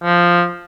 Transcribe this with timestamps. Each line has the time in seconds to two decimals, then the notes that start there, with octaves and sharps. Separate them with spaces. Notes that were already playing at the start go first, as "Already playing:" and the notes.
0.03 F3